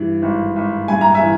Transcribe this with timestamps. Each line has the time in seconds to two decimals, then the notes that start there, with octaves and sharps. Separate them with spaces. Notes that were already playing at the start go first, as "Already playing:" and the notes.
Already playing: G2 E3
0.22 G#1
0.56 G#1
0.88 G2 G#5
1.01 A#5
1.14 E5 G#5
1.22 E3